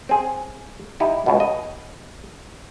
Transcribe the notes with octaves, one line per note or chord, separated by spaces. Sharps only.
C4 G#4
D#4 E4 G4
C#2 B2
D#5